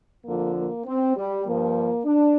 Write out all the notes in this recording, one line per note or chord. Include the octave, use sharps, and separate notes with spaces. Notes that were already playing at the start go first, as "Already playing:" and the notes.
F2 D3 F3 A#3
A#3
C4
G3
G2 F3 A#3
D4